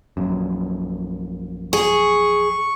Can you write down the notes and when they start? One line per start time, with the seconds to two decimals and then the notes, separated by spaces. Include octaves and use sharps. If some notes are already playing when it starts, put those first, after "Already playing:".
0.17 A#1 F#2
1.73 G#4 C#6